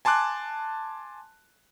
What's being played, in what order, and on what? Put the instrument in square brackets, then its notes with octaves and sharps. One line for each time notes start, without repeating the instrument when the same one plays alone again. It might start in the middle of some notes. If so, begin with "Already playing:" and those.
[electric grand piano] G#5 A5 C6 D6 F#6